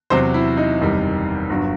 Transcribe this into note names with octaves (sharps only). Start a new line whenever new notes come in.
E2 C3 F#3 C5
E4
D#4
F#1 E2 C3 D#3 G3
G1 G2 F#3